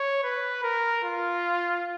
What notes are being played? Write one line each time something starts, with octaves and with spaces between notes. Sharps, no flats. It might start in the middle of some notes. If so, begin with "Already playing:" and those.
Already playing: C#5
B4
A#4
F4